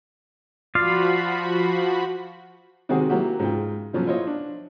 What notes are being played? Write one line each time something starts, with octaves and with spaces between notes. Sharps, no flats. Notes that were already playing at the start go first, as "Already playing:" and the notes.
F3 F4 F#4 D5 F5 B5
C3 D#3 G#3 C4 F#4 G#4
F#3 A#3 E4 F#4 G4
G#2 C#3 F4 G5
C#3 F3 F#3 C#4
E4 F4 C5 C#5 D#5
D4